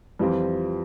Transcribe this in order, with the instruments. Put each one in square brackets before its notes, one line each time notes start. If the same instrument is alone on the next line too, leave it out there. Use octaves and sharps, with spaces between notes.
[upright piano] F2 E3 G3 C4 F4